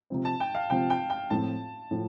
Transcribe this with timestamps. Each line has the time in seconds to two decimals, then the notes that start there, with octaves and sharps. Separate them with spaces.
0.10 C3 F3 C4
0.25 A5
0.40 G5
0.55 F5
0.70 C3 F3 C4 G5
0.90 G5
1.10 G5
1.30 A2 F3 C4 F4 A5
1.91 A2 F3